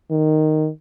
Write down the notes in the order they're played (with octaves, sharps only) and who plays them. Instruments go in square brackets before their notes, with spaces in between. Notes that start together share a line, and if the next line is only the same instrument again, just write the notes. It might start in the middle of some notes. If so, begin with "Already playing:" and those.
[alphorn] D#3